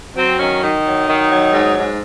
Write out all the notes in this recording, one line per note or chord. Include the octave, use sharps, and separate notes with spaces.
F#3 C4
D#3 C#4
D#3 D#4
F#3
D#3
F#3
G#2
G#2